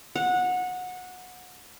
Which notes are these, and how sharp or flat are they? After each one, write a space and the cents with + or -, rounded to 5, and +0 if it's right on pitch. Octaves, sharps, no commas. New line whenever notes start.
F#5 -20